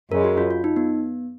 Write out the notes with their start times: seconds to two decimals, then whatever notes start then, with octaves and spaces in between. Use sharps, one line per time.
0.11 F#2 C#3 G#3 A#4
0.24 F#4
0.38 F4
0.51 F4
0.64 D#4
0.76 B3